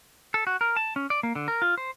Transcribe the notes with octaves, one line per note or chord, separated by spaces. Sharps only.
A4
F#4
A#4
A5
C#4
D5
A#3
D3
A#4
F4
C5